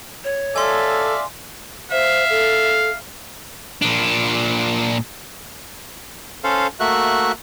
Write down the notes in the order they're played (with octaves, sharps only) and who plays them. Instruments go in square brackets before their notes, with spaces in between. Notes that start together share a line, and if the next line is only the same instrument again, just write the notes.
[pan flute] C#5
[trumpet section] A4 [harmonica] D5 E5 F5 [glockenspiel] G#5 C6
[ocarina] C5 [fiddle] E5 [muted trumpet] F5
[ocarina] A4
[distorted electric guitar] A#2 D4
[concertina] C#4 A4 C5 F5
A3 A#3 F#4 E5 F#6